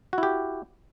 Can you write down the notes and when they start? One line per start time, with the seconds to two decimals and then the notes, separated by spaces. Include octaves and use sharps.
0.13 F#4
0.18 E4
0.23 G4